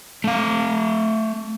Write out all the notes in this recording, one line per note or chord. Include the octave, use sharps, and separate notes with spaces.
A3 F5